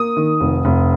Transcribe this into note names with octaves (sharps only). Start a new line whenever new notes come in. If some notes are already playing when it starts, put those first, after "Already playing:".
Already playing: A#3 D#6
D#3
F1
F1